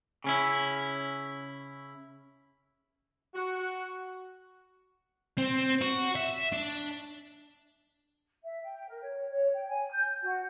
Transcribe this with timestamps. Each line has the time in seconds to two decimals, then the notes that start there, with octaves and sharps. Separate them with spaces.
0.24 C#3 C#4 E4
3.35 F#4
5.38 C4
5.81 F#4
6.16 E5
6.52 D4
8.43 E5
8.63 G5
8.88 A#4
9.02 C#5
9.30 C#5
9.53 G5
9.67 G#5
9.91 G6
10.22 F#4